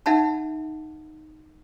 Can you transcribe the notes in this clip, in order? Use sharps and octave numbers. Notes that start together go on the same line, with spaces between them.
D#4 E5 F#5 A5 B5